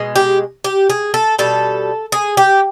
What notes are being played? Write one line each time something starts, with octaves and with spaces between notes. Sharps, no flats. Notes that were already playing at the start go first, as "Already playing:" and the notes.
Already playing: B2 G#3
G4
G4
G#4
A4
B2 G3 A4
G#4
G4